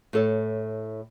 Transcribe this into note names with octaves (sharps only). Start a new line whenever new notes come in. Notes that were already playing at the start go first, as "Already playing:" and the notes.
A2 A4 C#5